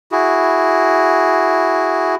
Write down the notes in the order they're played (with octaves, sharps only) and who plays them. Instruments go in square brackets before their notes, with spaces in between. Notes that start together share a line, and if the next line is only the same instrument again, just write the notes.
[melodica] E4 F#4 G#4